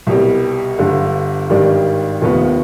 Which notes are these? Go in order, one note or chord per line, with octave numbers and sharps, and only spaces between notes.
C2 B2 G3
G1 G2 D3
G#1 G2 D#3 G3 D4
F1 D#2 D#3 B3 F4